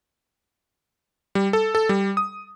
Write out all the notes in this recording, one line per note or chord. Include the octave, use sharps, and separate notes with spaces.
G3
A4
A4
G3
D#6